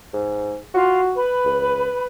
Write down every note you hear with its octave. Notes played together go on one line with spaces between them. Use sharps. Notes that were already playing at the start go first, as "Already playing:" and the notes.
G#2
F4 F#4
B4 B5
C#2